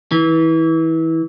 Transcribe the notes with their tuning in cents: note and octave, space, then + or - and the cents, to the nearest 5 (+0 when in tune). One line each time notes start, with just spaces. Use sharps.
E3 -25